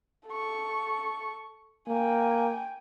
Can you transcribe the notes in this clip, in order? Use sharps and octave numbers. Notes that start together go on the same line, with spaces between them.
A4 C#6
A#3 G5 G#5